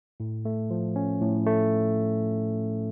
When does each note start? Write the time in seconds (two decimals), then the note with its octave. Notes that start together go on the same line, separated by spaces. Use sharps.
0.20 A2
0.45 A3
0.70 F3
0.96 C#4
1.21 A2
1.46 A3